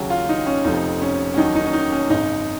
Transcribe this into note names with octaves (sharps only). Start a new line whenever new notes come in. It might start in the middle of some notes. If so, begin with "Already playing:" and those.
Already playing: D#2 C#3 F#3
F4
D#4
C#4
F1 F2 F3 D#4
C#4
C#4
D#2 D#3 F#3 D#4
D#4
C#4
D#4
C#4
G#1 F#2 C#3 D#4